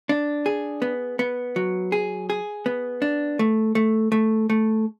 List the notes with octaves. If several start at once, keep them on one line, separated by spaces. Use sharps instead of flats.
D4
G#4
B3
B3
F#3
G#4
G#4
B3
D4
A3
A3
A3
A3